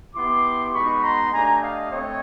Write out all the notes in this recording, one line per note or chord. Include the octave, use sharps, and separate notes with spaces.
B3 E4 G4 C6 D6
G#3 B3 D#4 F#4 B5 C#6
A#5 C6
A3 D4 G4 G#5 A#5
D#5 F5
A3 C4 C#5 D#5